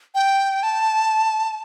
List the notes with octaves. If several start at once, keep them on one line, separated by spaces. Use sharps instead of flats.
G5
A5